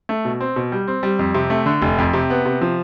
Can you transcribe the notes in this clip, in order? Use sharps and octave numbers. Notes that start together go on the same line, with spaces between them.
A3
B2
C4
B2
G3
C4
G3
F2
C3
A3
D3
F1
F2
C3
B3
C3
F3